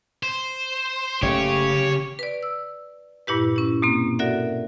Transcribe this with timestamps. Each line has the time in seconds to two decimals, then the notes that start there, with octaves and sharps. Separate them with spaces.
0.23 C5
1.22 F#1 C#3 A3 G4 C#5
2.19 B4 D5
2.43 E6
3.27 G2 A#2 E4 G4 B4
3.56 C#4 E4
3.82 B2 A#3 C4
4.19 F#4 A4 A#4 D5 E5 F#5